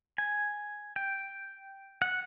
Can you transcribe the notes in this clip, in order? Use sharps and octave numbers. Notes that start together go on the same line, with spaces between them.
G#5
G5
F#5